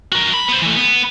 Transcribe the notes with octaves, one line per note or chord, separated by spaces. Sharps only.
F#4 A#4
B5
B3 C5
E3 A3
B3